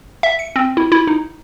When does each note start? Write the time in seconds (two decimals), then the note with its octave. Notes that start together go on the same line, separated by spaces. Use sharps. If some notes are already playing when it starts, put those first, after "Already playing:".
0.23 E5
0.39 C#7
0.56 C4
0.77 E4
0.92 E4
1.07 D#4